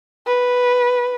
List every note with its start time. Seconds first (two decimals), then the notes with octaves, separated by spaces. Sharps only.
0.27 B4